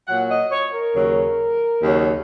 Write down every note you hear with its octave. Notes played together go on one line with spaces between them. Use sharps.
A#2 F#3 F#5
D#5
C#5
A#4
D#2 C#3 F#3
D#2 C#3 F#3